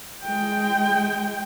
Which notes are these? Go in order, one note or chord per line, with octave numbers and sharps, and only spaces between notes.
G#3 G5